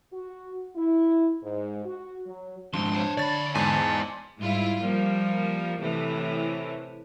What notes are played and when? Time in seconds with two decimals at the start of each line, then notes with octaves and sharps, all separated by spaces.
0.11 F#4
0.76 E4
1.42 G#2
1.85 F#4
2.26 F#3
2.74 F2 G#2 D4 C6
2.96 C5 C#5
3.17 D2 C#5 D5 B5 A6
3.55 E2 G#2 D5 G#5 A5
4.38 G#2 G3 E4 F4
4.81 F3 G3 A#3
5.80 A2 C3 E3